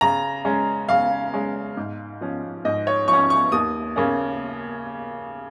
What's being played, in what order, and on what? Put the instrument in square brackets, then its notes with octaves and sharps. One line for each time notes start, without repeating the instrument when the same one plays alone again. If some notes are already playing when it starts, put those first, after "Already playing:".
[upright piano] C#3 A#5
G#3 C#4
C#3 F5
G#3 C#4
G#2
F3 C#4
G#2 D#5
C#5
F3 C#4 C#6
C#6
D#2 D#6
C#3 A#3 C#4